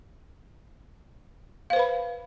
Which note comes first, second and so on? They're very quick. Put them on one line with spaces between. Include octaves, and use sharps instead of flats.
F5 C5 B4 B5